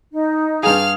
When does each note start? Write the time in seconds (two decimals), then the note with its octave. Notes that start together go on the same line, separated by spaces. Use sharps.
0.12 D#4
0.63 G2 G#4 F5 F6